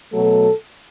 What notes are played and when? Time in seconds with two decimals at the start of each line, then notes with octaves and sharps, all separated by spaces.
0.13 B2 F#3 A3 A4